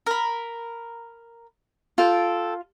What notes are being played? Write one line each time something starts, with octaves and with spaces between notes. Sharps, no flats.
A#4 B5
F4 A4 G5